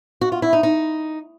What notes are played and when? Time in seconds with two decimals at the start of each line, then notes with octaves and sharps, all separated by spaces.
0.21 F#4
0.32 F4
0.42 E4
0.53 D#4
0.63 D#4